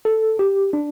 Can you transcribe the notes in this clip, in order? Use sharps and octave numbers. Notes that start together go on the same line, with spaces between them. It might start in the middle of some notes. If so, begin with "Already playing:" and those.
A4
G4
D4